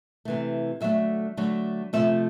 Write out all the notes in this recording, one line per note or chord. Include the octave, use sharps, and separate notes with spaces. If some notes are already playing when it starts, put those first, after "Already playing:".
C3 E3 A3
D3 F#3 A3 E5
D3 F#3 A3
C3 F3 A3 E5